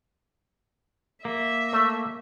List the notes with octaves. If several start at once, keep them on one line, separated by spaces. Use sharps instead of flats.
A#3 E5
A3